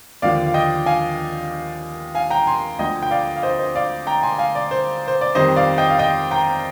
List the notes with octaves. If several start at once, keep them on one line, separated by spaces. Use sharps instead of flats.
D#2 D3 F3 D5 F5
F5
D#5 G5
F5 G#5
F5 G#5
G5 A#5
G#5 C6
D2 D3 F3 D#5 G5
G5
D5 F5
F5
C5 D#5
C5 D#5
D5 F5
G5 A#5
G#5 C6
F5 G#5
D5
C5
C5
D5
F2 D#3 G3 C5 D#5
D5 F5
D#5 G5
F5
D#5 G5
G5 A#5